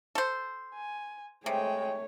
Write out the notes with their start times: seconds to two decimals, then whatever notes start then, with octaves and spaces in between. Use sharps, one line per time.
0.15 A4 C5
0.74 G#5
1.46 C3 G#3 A3 C#5 G5